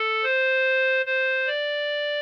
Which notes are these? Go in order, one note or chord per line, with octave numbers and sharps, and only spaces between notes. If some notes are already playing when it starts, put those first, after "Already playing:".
Already playing: A4
C5
C5
D5